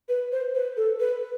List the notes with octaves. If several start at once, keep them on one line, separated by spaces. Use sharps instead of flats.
B4
C5
B4
A4
B4